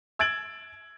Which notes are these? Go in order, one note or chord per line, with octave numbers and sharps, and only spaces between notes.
E6 G#6 A6 D7 F#7